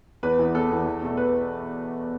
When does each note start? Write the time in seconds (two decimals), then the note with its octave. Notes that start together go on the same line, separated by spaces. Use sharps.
0.23 E2 B4
0.39 E3 B3
0.55 E2 A4
0.70 E3 B3
0.86 E2
1.02 B2 A3
1.17 B4